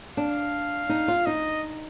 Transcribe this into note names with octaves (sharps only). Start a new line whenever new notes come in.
D4 F5
D#4
F4
D#4 D#5